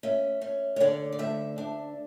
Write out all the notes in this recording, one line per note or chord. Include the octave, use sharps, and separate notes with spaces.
C#4 E5
C#4
C#5
D3 D5
D5
D2 E5
D4